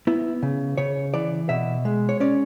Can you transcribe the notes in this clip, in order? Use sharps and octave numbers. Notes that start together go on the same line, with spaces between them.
B3 E4
C#3
C#3 C#5
E3 D5
B2 E5
G#3
C#5
C#4 D5